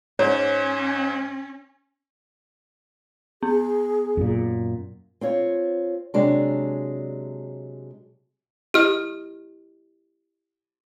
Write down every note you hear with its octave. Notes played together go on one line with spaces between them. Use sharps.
G#2 C#4 C#5
B3 G#4
F#2 A#2
C4 F4 C#5
C3 F#3 G#3 C#4 D4
E4 G4 D#5 F6